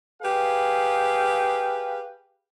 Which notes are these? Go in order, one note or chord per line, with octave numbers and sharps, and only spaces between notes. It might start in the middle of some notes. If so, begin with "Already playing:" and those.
G4 G#4 B4 F5